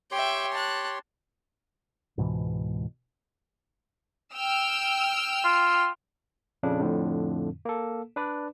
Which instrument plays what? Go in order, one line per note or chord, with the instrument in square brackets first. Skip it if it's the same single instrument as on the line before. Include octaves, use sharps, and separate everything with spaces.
[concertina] G4 C#5 C6 [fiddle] E5 G5
[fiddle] A5 F#6
[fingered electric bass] C#2 G#2 B2 E3
[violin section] G5 E6 F6
[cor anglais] F4
[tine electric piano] A#1 F2 C#3 D4
F2 A2 D3
A#3 A4
D4 B4 D5